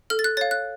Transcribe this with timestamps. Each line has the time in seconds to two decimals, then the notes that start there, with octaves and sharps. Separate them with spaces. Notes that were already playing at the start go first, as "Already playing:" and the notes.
0.10 A4 F6
0.19 A6
0.24 F#6
0.37 C#5 F5 A6
0.51 F#6